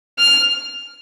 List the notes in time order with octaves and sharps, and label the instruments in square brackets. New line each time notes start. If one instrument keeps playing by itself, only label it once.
[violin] F6